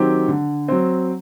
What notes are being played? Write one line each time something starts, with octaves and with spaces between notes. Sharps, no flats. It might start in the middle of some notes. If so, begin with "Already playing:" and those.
Already playing: D#3 F#3 C4 G4
D3
F#3 C4